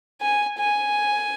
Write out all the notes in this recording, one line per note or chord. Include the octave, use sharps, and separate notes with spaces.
G#5
G#5